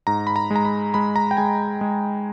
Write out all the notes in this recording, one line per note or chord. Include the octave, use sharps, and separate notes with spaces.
G#2 A#5
B5
A#5
G#3
A#5
B5
G#3 B5
A#5
G5
G#3 G#5
G#3